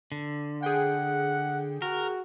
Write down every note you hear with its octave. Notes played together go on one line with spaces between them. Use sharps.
D3
G#4 F#5 G5
F#4 A#4